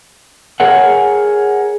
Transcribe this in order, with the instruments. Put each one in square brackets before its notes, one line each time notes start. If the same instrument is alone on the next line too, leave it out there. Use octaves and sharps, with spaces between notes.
[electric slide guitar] G#4 A#4 C#5 F#5